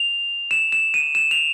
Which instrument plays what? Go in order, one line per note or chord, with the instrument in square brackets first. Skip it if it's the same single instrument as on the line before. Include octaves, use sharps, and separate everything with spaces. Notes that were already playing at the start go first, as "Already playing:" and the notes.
Already playing: [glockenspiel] F7
E7
E7
D#7
E7
F7